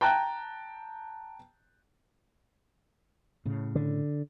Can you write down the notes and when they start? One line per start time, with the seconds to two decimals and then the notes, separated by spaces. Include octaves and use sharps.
0.01 G5 A5 A#5 F#6
3.46 A2 C#3
3.75 D3